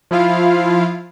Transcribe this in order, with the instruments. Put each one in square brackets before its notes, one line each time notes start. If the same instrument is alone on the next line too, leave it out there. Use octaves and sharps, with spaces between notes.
[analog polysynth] F3 E4 F4 F5